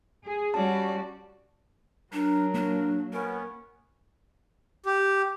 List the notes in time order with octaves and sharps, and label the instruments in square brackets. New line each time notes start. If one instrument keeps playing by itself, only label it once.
[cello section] G#4
[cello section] G3 F#4 [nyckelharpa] C#4 D5 [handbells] A5
[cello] F#3 [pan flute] D4 [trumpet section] A#4
[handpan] A#3 [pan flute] D4
[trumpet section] B3 C#4 [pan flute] A#4
[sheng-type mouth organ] G4